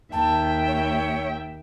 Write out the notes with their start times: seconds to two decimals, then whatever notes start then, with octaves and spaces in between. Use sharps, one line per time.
0.12 D#2 E5 G5 A5
0.67 C#5